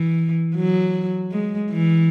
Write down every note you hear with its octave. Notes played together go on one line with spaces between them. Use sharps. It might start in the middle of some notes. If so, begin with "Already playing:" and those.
Already playing: E3
F#3
G#3
E3